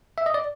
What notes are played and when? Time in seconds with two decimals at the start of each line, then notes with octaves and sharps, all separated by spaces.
0.18 E5
0.26 D#5
0.34 D5